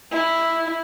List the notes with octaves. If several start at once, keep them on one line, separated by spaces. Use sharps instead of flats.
E4